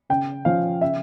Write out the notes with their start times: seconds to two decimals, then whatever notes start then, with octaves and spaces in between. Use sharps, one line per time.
0.09 C#3 G5
0.45 F3 C#4 F5
0.81 C#3 E5